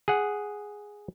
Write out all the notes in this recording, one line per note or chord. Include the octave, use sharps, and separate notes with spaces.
G#4 F#5